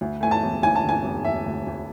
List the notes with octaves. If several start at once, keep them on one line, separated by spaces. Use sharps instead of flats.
D2
A3 G#5
A5
E1
D2 G#5
A5
D3
G#5
E1
E1 E5
D2
D2